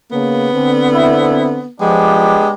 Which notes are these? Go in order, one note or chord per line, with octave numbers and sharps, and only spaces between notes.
C#3 A#3 B3
D3 C4
E4
F3 G#3 B3 D4 G4